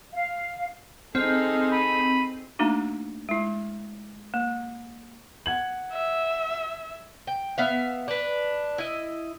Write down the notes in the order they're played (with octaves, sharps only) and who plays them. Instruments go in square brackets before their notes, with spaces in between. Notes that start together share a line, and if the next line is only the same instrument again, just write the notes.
[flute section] F5
[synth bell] C4 [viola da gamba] D#4 G#4 A4 [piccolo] F6
[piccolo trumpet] B5 [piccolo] D#7
[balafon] A3 A#3 D4 D#4 F#4
G#3 E4
A#3
[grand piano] F#5 G#6 F#7
[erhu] E5
[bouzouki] G5
B3 E5 F5
D4 B4
E4 D#5